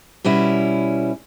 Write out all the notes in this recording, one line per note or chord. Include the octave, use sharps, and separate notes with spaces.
B2 G3 C#4 E4